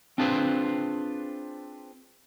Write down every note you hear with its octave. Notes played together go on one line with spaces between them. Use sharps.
C4 D4 F4 G#4 B4 C5